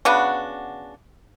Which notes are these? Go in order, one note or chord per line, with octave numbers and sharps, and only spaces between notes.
C#3 B3 D4 F#4